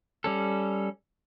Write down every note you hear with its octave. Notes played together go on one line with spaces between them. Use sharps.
G3 C#4 A4